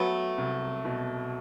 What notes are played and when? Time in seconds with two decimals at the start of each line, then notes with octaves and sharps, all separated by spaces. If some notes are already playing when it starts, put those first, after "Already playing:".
Already playing: F#3 A3 B3
0.38 C2
0.85 B2